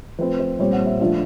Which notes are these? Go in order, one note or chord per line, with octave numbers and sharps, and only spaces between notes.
F3 A3 C4 B4
C5
A#2 G3 C4 C#5
F#5
E5
F3 A3 D4 F4 E5